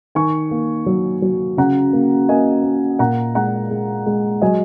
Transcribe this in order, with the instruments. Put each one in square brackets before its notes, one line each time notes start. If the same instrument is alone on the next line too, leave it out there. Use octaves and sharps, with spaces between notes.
[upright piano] D#3 G#5 C#6
A#3
F#3
F#3
C#3 F#5 A#5
A#3
A#3 D#5 G#5
A#3
A#2 F#5 A#5
G#3 F#5 A#5
G#3
G#3
F#3 D#5 G#5